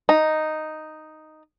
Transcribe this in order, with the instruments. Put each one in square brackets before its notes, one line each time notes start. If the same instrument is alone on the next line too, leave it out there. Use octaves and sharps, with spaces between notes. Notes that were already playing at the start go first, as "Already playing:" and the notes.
[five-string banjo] D#4